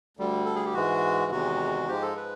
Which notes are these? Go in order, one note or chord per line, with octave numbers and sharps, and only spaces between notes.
D2 D3 G3
A4
G#4
G4
G#2 E3 G#3 F#4
E2 C3 D#3 G#3 F#4
G#2 F3 G#3 G4
A4
B4